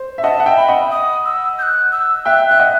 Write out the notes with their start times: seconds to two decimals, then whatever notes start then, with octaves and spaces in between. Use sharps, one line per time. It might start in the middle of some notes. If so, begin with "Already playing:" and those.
Already playing: C5
0.18 E5
0.23 D#5 F#5 A5
0.40 F#5
0.46 E5 G5
0.57 B5
0.69 D#5 F#5
0.91 D#6
1.25 E6
1.59 G6
1.62 F#6
1.92 E6
2.25 E5 G5 F#6
2.48 E5 F#6
2.60 D#5 F#5